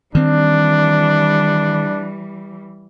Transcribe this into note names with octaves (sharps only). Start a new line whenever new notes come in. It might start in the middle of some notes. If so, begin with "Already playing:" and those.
D#3 E3 G3 C4 D4